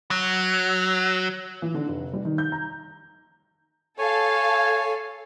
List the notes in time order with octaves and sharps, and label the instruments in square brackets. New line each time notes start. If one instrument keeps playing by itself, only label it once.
[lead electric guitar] F#3
[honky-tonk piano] E3
D3
F1
G3
D#3
G6
A#5
[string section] A4 F5 [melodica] C#5 G#5